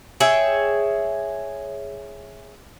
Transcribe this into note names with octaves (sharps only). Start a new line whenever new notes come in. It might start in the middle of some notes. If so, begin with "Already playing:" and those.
G#4 C#5 E5 G5